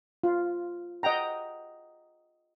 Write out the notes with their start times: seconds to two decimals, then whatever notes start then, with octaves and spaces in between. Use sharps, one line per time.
0.24 F4
1.03 D#5 F#5 G5 A#5